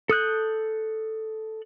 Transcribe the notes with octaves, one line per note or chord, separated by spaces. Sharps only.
A4 D#6 F#6 G6